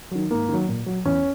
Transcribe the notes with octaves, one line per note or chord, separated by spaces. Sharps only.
D#3 F#3
G#2 A#3
D#3 F#3
A#2
F#3
E2 C#4